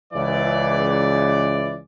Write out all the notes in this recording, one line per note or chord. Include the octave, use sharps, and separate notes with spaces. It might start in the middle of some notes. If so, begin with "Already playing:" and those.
C#2 E3 D5